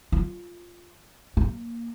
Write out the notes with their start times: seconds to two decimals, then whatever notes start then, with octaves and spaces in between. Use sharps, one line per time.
0.12 F4
1.37 A#3